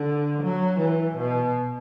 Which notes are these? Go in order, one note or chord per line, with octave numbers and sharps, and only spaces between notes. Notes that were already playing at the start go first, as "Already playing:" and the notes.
Already playing: D3
F#3
E3
B2